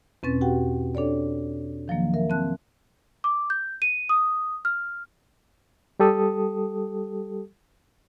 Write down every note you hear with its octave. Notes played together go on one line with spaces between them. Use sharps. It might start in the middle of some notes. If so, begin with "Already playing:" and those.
E2 B2 C4 C#4 B4 A6
F#4 G4 F#5 G5
D4 A4 C#5 D5
D#3 F3 F#3 A#3
A#4 E5
C4 A5 F#6
D6
G6
D#7
D#6
F6
G3 G4 A4 D#6